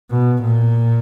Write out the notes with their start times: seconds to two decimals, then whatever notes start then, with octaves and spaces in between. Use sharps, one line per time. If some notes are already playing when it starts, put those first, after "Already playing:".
0.11 B2
0.42 A#2